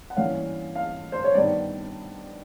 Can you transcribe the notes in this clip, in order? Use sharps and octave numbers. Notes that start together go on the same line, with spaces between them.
F#5
G2 E3 G3 A#3 C#4 F5
F5
C5
C#5
G2 D#3 G3 B3 D5